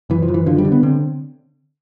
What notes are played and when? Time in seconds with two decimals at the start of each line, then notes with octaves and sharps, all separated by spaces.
0.10 F#1 E3
0.22 F3
0.28 F#1
0.34 E3
0.46 D3 F3
0.58 G3
0.65 D3
0.72 B3
0.83 D3 C4